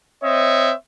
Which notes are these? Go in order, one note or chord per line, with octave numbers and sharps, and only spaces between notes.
C4 C#5 D#5 E5